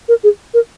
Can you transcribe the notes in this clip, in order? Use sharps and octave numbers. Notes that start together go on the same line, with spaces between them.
A#4
G#4
A#4